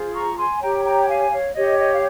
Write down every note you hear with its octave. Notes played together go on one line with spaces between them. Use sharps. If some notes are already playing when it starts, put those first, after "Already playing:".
Already playing: F4 G#4 C5
A#5 C#6
G#5 C6
G4 C#5 G5 A#5
G5 A#5
F5 G#5
C#5 F5
G4 C#5 D#5
D#5
F5